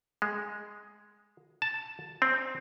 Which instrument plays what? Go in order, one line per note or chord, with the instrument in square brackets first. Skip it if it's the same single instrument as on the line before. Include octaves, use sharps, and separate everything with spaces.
[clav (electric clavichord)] G#3
A5
C4